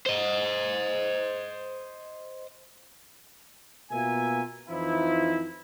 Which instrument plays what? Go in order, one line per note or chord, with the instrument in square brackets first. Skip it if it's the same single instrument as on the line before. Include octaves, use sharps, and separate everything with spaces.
[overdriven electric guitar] C5 D#5
[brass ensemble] B2 A#3 B3 F4 E5 G#5
F2 E3 F3 D#4 E4